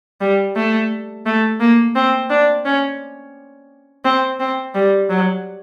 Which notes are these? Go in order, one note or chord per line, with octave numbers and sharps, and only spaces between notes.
G3
A3
A3
A#3
C4
D4
C#4
C4
C4
G3
F#3